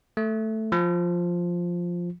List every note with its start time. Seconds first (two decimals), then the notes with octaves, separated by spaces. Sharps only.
0.17 A3
0.72 F3